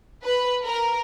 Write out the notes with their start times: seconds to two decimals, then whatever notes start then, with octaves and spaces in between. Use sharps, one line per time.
0.24 B4
0.65 A#4